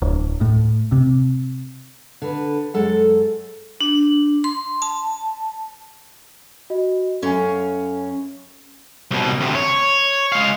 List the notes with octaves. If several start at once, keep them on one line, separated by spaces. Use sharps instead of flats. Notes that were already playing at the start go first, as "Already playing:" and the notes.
D1
A2
C3
D3 B4
F#2 G#3 A4 F#5
D4
C6
A5
F#4 D#5
F#2 C#4 A4 F5 G#5
C2 B2
D2 C3
C#5
G#3 F5